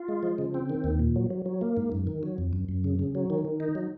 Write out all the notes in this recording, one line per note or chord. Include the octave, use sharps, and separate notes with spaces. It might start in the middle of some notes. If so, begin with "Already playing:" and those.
Already playing: F4
G#3
F3
C#3
C4
D#3
D#2
A#2
F#3
F#3
F#3
A#3
G#2
F#2
D#3
F#3
F2
F#2
F#2
C#3
C#3
F#3
D#3
D#3
D#4
F#3